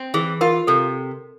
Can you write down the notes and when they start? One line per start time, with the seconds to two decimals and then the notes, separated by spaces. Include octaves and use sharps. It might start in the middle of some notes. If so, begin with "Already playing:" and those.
Already playing: C4
0.14 E3 G#4
0.41 F4 A#4
0.67 C3 A4